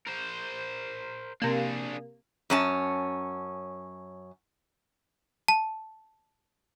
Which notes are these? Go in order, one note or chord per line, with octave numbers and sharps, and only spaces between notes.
A#4 C5
C3 A#3 D4 G#4
F#2 C#4 A5
A5